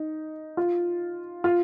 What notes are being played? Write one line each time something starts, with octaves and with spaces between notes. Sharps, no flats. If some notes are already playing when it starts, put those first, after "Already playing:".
Already playing: D#4
F4
F4